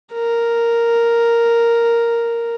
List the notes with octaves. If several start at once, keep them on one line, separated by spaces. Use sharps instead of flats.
A#4